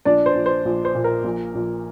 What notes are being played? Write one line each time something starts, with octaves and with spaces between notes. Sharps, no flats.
A#1 D4 D5
C5
A#1
C5
A#1
C5
A#2
A#4
A#1
A#1